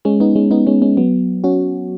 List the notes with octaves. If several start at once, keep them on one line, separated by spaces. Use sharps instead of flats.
G#3 C#4
B3 D#4
G#3 C#4
B3 D#4
G#3 C#4
G#3 C#4
F#3 B3
C#4 F#4